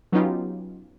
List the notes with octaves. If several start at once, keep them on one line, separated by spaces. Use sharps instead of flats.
F#3 B3 C#4 D#4 F4 G4